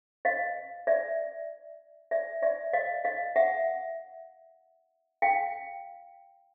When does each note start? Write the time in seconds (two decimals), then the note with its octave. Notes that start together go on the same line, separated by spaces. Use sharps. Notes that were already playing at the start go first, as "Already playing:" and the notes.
0.25 D#5 F5
0.87 D5 E5
2.11 D5 E5
2.42 D5 E5
2.73 D#5 F5
3.05 D#5 F5
3.36 E5 F#5
5.22 F5 G5